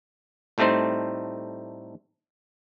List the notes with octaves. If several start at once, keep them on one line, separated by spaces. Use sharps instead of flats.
A2 G3 A3 C4 D#4 C5